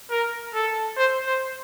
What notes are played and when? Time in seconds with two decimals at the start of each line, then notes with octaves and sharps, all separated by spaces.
0.10 A#4
0.55 A4
0.97 C5
1.26 C5